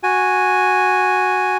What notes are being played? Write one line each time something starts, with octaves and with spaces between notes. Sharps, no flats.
F#4 G#5